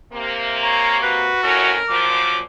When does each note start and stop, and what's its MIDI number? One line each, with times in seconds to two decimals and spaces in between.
0.12 1.30 48
0.12 1.30 58
0.63 0.98 73
0.63 0.97 82
1.03 1.74 66
1.03 1.40 71
1.43 1.77 41
1.43 1.77 45
1.43 1.77 61
1.43 2.12 70
1.90 2.39 46
1.90 2.39 53
1.90 2.39 54
1.90 2.43 86